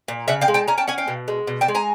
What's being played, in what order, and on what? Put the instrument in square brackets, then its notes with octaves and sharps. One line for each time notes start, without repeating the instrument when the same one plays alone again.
[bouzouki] A#2
C#3 E5 F#5
F5 G5
G#3
G5 A5
C#4 G#5 A#5
G5 A5
C#4 F#5 G#5
F5 G5
B2
G#3
B2
G5 A5
G#3
G#5 A#5